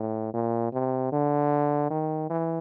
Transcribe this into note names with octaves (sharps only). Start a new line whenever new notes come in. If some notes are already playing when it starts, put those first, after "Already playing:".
Already playing: A2
A#2
C3
D3
D#3
E3